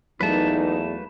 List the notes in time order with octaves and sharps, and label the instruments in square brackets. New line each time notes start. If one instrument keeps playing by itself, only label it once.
[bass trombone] E2 [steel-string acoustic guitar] F#3 A3 A#3 [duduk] D#4 [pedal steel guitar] B4 A5